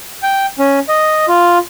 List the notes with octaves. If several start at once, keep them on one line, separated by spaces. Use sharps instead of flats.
G5
C#4
D#5
F4